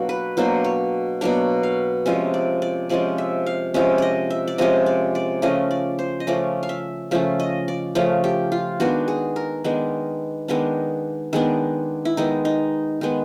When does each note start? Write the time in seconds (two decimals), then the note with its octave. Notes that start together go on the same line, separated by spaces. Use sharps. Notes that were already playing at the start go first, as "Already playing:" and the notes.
Already playing: B2 F#3 A#3 D4 F#4
0.09 B4
0.37 B2 F#3 A#3 D4 C5
0.64 C#5
1.21 B2 F#3 A#3 D4 C#5
1.63 F5
2.06 C3 F3 G#3 C#4 E5
2.34 D5
2.62 D5
2.89 C3 F3 G#3 C#4 D5
3.18 E5
3.46 F5
3.74 C3 F3 G#3 C#4 E5
3.98 D5 D#5
4.30 E5
4.48 D5
4.58 C3 F3 G#3 C#4 D#5
4.86 D5
5.15 D5
5.42 C#3 F3 A3 C#4 D#5
5.71 D5
5.99 C5
6.20 D#5
6.27 C#3 F3 A3 C#4 D5
6.63 F5
6.69 E5
7.11 C#3 F3 A3 C#4 E5
7.40 D#5
7.68 D5
7.95 C#3 F3 A3 C#4
8.24 G4
8.52 F4
8.80 D#3 G#3 B3 D4 F#4
9.08 G#4
9.36 A#4
9.64 D#3 G#3 B3 D4
10.48 D#3 G#3 B3 D4
11.33 D#3 G#3 B3 D4 G#4
12.05 E4
12.17 D#3 G#3 B3 D#4
12.45 D#4
13.01 D#3 G#3 B3